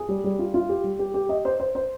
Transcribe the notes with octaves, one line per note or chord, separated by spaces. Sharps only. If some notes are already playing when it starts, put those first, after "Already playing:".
Already playing: G#4
G3
G3
F4
F4
G4
G3
G4
G4
D#5
C5
C5
C5